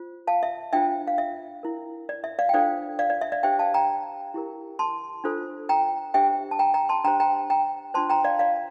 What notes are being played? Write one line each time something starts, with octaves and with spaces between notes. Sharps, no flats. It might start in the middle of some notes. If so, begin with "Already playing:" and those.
Already playing: F4 C5
F5 A5
E5
D4 F4 C5 E5 G5
F5
E5
E4 A#4
D5
E5
D5 F5
G5
D4 F4 A4 C5 D5 F5
D5 F5
D5
E5
D5 F5
D4 G4 C5 E5 G5
F5 A5
G5 A#5
E4 G4 A#4
A5 C6
D4 F4 A4 C5
G5 A#5
D4 G4 C5 E5 G5
A5
G5 A#5
G5 A#5
A5 C6
D4 G4 C5 G5 A#5
G5 A#5
G5 A#5
D4 F4 C5 A5 C6
G5 A#5
D5 F5
D5 F5